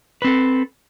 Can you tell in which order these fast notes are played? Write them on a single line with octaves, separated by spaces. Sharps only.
B4 C4 A4